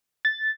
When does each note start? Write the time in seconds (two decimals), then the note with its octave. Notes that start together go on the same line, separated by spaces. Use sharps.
0.25 A6